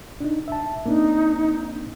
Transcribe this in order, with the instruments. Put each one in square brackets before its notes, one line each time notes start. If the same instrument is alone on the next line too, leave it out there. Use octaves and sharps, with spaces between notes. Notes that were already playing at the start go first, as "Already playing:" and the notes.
[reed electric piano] D4 D#4
E5 A5
[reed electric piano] A#3 C4 D4 [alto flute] D#4